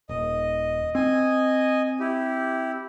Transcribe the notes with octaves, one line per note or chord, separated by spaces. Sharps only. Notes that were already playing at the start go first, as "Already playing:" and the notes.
D#1 D#5
C4 D#5 G#5
E4 G4